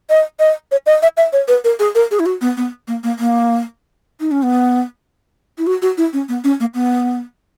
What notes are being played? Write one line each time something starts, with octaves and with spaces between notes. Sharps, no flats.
D#5
D#5
C#5
D#5
E5
E5
C#5
B4
A#4
G#4
A#4
G#4
E4
F#4
B3
B3
A#3
A#3
A#3
D#4
C#4
B3
E4
F#4
F#4
E4
C#4
B3
C#4
A#3
B3